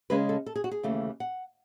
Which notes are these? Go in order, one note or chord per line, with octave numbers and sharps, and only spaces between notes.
C#3 G#3 C#4 B4
A4
A4
G#4
F#4
G#4
D#2 C#3 E3 A3
F#5